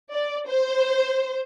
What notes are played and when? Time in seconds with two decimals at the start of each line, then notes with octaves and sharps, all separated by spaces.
0.13 D5
0.47 C5